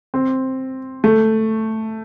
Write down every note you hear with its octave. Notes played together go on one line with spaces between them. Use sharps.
C4
A3